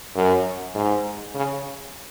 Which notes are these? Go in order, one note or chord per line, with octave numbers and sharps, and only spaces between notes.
F#2
G#2
C#3